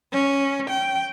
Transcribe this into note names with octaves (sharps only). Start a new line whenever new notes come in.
C#4
G5